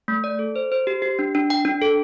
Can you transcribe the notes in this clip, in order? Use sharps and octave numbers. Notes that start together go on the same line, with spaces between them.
A3
D5
A4
C5
C5
G4
G4
D4
D4
G5
D4
A4